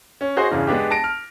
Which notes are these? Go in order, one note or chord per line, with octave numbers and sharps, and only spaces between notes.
C#4
F#4 G#4 C5 D#5
E2 G2 C#3 E3
G#3 B3 D4 G4
A5 A#6 D7
F6